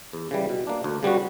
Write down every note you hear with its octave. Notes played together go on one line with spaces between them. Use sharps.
E2
C#3 E3 G3
B2
A#3 D4
D2
C#3 G3 B3 F#4